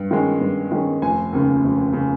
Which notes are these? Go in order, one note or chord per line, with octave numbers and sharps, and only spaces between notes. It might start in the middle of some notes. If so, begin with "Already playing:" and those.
Already playing: G2
D#3 G#3 C#4
G2
D#3 G#3 C#4
F1 G#5
D#2 C#3
F1
C#3